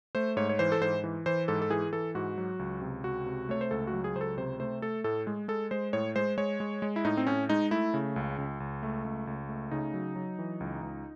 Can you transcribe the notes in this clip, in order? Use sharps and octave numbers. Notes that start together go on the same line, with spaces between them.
A3 C5
G#2 C#5
C#5
E3 C5
A4
G#2 C5
E3
E3 C5
G#2 A4
A4
E3 G#4
E3 A4
G#2 F#4
F#3
C#2
C3
C#2 F#4
C3
A3 C#5
C5
C#2 A4
F#4
F#3
G#4
C#2 C5
A4
C3 C5
A3 C5
A3 A4
A2 A4
G#3
G#3 A4
G#3 C5
A2 C#5
G#3 C5
G#3 C#5
G#3
G#3
E4
A2 D#4
C4
A2 C#4
G#3 D#4
A3 E4
C#3
C#2
C#2
C#2
A3
C#2
C#2
A3
C#3 D#4
F#3
F#3
E3
C#2
C#2